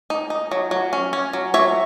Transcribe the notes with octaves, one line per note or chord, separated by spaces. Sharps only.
D#4
D#4
F#3
F#3
C#4
C#4
F#3
F#3 C#5 E5